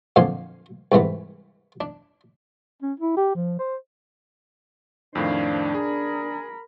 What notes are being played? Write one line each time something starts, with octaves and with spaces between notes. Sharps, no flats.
F2 A#2 D3 F3 G#5 C6
C2 G#2 E3 B3
D4
C#4
E4
G4
F3
C5
F2 A2 D#3 D4 C5 F5
G#4 A#4 B5